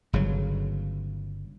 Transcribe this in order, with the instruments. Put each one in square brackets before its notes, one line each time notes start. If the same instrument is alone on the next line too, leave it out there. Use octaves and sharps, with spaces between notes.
[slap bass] G1 C#3 F#3